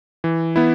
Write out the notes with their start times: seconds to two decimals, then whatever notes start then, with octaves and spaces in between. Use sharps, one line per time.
0.24 E3
0.56 B3 E4